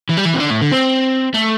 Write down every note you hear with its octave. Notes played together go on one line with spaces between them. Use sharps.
E3
G3
E3
C3
D3
A2
D3
C4
A3